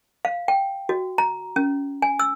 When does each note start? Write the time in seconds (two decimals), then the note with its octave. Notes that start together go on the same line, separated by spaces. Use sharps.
0.25 F5
0.48 G5
0.89 F#4
1.18 A#5
1.56 C#4
2.02 G#5
2.19 E6